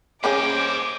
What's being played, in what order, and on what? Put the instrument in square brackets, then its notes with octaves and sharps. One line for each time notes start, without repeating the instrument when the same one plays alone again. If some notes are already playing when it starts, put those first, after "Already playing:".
[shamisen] A#3 C#4 G#4 [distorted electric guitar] C5 D#5 [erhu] D6